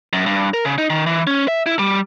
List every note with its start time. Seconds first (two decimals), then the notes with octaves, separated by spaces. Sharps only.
0.13 F#2
0.26 G2
0.54 A#4
0.65 C#3
0.78 D#4
0.90 D#3
1.06 E3
1.27 C#4
1.48 E5
1.66 E4
1.79 G3